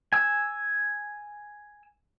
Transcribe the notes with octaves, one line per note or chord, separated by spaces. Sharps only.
G#5 E6